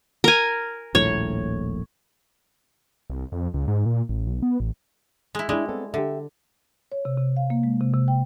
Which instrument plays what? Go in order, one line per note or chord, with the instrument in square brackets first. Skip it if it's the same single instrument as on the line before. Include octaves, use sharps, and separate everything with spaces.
[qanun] A#4 G#5
[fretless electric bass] D#1 A#1 A2 [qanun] C#5
[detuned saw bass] C2
F2
C#2
G#2
A#2
A1
B1
B3
A1
[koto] G#3 E4
[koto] G3 G#3 [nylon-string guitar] D4 E4
[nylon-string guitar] B3 C4 A4
[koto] D3 [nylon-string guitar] G4 E5
[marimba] C#5
C3
C3
F5
A#3
G#3
C3
C3
G5